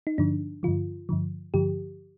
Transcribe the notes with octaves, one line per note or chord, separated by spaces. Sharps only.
D#4
G2 D3 F3 D4
G2 D3 F3 F4
G2 D3 F3
G2 D3 F3 G4